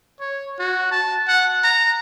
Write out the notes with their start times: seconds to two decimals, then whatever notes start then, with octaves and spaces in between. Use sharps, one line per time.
0.20 C#5
0.59 F#4
0.91 A5
1.28 F#5
1.64 A#5